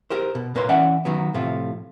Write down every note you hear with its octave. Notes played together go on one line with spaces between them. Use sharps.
G4 A#4 C5
B2
A#2 A#3 B4 C#5 C6
E3 C#4 D5 E5 F#5 G5
D#3 F#3 B3
A2 C3 F3 A3 F4